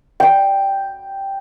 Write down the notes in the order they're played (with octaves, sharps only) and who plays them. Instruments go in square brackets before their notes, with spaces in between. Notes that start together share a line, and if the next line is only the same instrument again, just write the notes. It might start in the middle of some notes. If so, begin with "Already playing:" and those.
[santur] G5